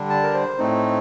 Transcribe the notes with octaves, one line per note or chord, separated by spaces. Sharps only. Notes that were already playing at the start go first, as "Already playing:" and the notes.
Already playing: D3 G3 D4
A5
A#4
C5
A2 A3 C4 D#4